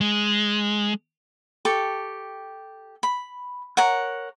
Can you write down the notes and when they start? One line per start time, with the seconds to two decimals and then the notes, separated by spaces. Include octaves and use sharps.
0.01 G#3
1.65 G4 A4 C#6
3.03 B5
3.77 A#4 C#5 F#5